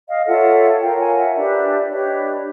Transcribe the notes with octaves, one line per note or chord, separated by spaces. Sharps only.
D#5 F5
F4 A4 C#5 E5 F#5
F4 A#4 C#5 F5 G5
F#5 G#5
E5 F#5
D4 G4 B4 D5 E5
E5
D4 G4 B4 C#5 D#5